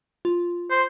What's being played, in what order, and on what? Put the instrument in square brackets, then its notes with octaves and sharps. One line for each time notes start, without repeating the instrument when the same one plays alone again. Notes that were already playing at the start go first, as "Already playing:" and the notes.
[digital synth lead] F4
[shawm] C5